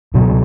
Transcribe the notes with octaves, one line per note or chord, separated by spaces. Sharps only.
C#2 B2 F#3 B3